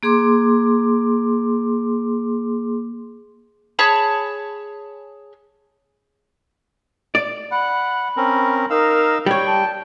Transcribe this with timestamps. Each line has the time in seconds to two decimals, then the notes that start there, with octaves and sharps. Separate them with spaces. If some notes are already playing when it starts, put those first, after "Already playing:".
0.03 A#3 G#4 C6 D6
3.79 G#4 C#5 A5 B5
7.15 D5
7.52 F#5 B5
8.17 C4 C#4 A#4
8.70 D#4 A#4 F5 E6
9.26 G3 C#5 G5
9.47 A5